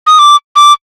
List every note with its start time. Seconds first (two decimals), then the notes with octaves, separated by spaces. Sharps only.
0.07 D#6
0.19 D6
0.56 D6